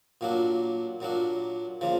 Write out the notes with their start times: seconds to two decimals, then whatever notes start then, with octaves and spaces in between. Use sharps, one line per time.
0.21 A#2 F#3 A#3 D4
1.01 A#2 F#3 A#3 D4
1.81 C#3 F3 A#3